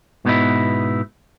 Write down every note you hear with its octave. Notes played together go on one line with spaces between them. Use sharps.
G#2 B2 B3 C#4 D#4 E4